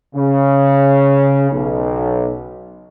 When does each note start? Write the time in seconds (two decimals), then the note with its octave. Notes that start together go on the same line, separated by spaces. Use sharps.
0.15 C#3
1.51 B1